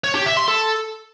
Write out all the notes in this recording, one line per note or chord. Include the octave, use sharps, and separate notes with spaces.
C#5
G4
E5
C6
A4